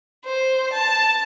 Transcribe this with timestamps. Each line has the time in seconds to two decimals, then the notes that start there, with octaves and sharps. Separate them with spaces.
0.25 C5
0.73 A5